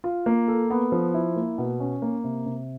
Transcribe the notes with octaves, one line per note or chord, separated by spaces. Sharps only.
F4
A#3
A4
B3
F3
E4
A#3
B2
C#4
A#3
C3
C3